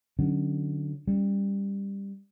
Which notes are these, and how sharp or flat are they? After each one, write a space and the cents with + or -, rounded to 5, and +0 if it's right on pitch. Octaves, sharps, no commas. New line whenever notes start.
D3 +15 F#3 +0 C#4 +0
G3 +15 C#4 +0